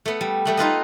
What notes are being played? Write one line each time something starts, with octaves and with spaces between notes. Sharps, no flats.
A3 B3
G3
G3 A3 B3
D#4 F4 B4 D#5